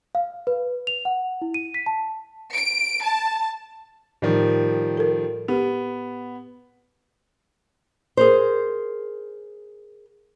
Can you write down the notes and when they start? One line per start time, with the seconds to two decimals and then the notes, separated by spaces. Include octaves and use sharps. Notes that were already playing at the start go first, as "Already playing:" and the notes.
0.15 F5
0.47 B4
0.87 F7
1.05 F#5
1.42 E4
1.54 D#7
1.74 B6
1.86 A5
2.53 D7
3.04 A5
4.22 A2 D#3 F3 G3
4.97 A4 A#4
5.48 B3 G4
8.17 G#4 A#4 C5